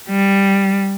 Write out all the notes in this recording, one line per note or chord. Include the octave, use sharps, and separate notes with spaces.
G3